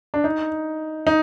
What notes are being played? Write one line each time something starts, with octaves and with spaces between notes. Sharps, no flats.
D4
D#4
D#4